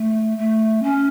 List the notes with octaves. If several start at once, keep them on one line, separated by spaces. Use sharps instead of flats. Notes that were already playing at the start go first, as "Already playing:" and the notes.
Already playing: A3
A3
C#4